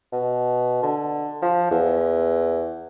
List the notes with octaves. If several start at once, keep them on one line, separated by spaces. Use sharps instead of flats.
B2
D3
F3
E2